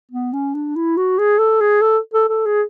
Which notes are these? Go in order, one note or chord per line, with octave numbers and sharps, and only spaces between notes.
B3
C#4
D4
E4
F#4
G#4
A4
G#4
A4
A4
A4
G#4